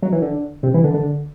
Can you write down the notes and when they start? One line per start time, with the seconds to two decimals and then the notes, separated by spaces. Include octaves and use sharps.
0.02 F#3
0.12 E3
0.22 D3
0.63 C3
0.74 E3
0.84 D3
0.94 D3